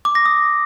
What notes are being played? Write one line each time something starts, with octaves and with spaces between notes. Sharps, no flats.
D6
A#6
D#6